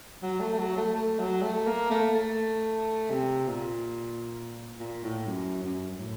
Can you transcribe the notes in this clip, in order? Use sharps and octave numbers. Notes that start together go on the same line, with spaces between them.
F#3
A3
A3
F#3
A3
A3
F#3
A3
A#3
A3
A3
C3
A#2
A#2
A2
F#2
F#2
F#2
A2